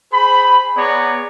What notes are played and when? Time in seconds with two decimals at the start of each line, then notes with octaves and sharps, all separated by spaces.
0.12 G#4 C5 B5
0.77 B3 G#4 C#5 D5 A#5